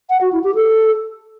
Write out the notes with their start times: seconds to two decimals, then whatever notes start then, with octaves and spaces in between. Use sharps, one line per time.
0.10 F#5
0.21 F#4
0.32 E4
0.44 G4
0.55 A4